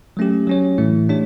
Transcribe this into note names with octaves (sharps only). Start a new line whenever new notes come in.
F#3 A3 C#4 G4
F#3 C#4 G4 C#5
A2 E3 A3 E4
A3 D4 G4 C#5